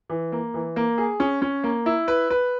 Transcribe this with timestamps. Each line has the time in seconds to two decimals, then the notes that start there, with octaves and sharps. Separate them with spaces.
0.09 E3
0.32 A#3
0.54 E3
0.76 A#3
0.98 G#4
1.20 C#4
1.42 C#4
1.64 A#3
1.86 E4
2.08 B4
2.30 B4